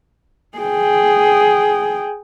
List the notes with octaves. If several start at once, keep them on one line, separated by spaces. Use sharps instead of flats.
G#4 G5